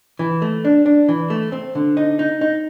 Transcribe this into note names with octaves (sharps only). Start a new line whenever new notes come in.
E3
A3
D4
D4
E3
A3
C4
D3
D#4
D#4
D#4